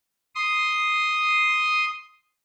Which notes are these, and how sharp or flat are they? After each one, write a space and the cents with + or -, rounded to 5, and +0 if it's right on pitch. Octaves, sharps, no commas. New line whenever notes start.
C6 +0 D#6 +0